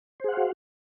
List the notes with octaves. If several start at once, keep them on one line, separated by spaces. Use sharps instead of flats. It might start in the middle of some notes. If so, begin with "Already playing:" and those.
F#4 G#4 C5 F5 F#5